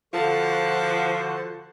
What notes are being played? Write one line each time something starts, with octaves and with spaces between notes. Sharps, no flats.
D3 F3 F4 F#4 A4 C5 F#5 A5